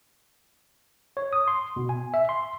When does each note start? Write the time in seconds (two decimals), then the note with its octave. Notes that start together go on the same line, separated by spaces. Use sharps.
1.17 C#5
1.33 D#6
1.48 C6
1.76 B2
1.89 G#5
2.14 E5
2.29 C6